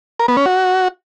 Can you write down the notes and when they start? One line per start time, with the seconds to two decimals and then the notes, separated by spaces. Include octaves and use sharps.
0.20 A#4
0.28 B3
0.37 C#4
0.46 F#4